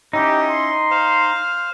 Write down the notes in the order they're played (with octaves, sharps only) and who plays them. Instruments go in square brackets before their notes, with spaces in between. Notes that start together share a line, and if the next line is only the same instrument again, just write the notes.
[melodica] C#4 E4 D#5 [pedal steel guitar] D#4 [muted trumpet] G4
[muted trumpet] C6
[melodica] C5 F5